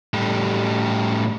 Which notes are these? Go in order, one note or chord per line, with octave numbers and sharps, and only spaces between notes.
A2 G3